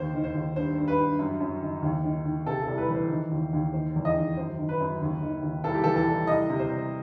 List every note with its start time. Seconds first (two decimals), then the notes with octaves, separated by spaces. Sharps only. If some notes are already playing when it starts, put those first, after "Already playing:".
Already playing: D#2 C5
0.14 D#3
0.24 C5
0.34 D#2
0.56 G2 C5
0.78 G2
0.88 B4
0.98 G2
1.19 F#2
1.40 F#2
1.62 D#3
1.83 D#2
2.04 D#3
2.25 D#3
2.46 C3 A4
2.62 A4
2.68 C2
2.78 B4
2.88 E3 B4
2.94 C5
3.10 D#3
3.31 D#2
3.53 D#2
3.73 D#3 C5
3.95 E2
4.05 D#5
4.16 D#3
4.37 F#2 C5
4.59 D#3
4.69 B4
4.80 F#2
5.01 D#2
5.22 D#3
5.43 D#2
5.64 C2 A4
5.75 G4
5.84 E3 A4
5.96 A4
6.07 C2
6.27 C2 D#5
6.49 C3
6.59 C5
6.69 C2